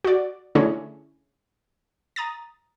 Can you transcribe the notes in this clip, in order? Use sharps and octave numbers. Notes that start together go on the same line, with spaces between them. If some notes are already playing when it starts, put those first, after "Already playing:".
F#4 D5
D3 A3 C#4 D4 E4 G#4
A#5 D#6 A6